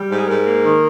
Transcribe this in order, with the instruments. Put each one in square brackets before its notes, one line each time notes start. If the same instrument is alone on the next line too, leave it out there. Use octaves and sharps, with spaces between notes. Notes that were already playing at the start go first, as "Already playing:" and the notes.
Already playing: [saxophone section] G3
G#2
G#4
G#2 A#4
A#3
D#3